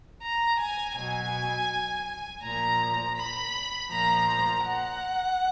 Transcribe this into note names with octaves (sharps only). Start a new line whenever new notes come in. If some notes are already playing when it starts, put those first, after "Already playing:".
A#5
G#5
B2 F#3 G#5
A#2 F3 A#5
B5
A#2 F3 A#5
F#5